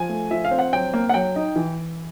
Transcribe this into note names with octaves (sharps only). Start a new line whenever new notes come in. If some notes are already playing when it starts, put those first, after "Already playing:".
Already playing: F3 G#5
A3
F3 E5
F5
C4
F#5
F#3 G5
A#3
F#5
F#3 G5
D#4
E3